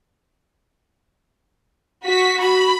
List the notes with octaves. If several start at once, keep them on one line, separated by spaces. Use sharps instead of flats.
F#4 B6
F#4 B5